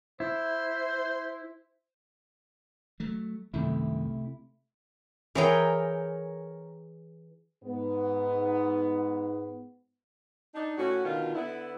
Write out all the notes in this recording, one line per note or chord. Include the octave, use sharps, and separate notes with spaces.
E4 C5
F#3 A3
C2 F#2 C3 D#3 A3 E4
E3 G#4 A#4 C#5 G5
G#2 B3
D4 D#4
A2 C#4 F#4
B2 D3 D#3 F4
D3 B3 E4